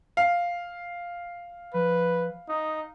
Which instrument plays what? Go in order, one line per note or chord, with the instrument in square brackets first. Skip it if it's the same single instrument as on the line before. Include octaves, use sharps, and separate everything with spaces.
[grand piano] F5
[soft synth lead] F3 [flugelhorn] B4
[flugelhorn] D#4 [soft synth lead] D#6